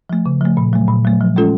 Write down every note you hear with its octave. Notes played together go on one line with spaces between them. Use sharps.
F3 A3
C#3
F3 A3
A#2
F#3 A3
A#2
F#3 A3
F3
G#3 C#4 F4 A4